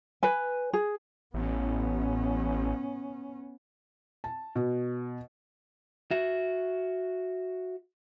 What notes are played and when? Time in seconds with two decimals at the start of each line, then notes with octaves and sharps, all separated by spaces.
0.23 B4 G#5
0.73 G#4
1.34 A1 B3 C#4
4.24 A5
4.55 B2
6.11 F#4 E5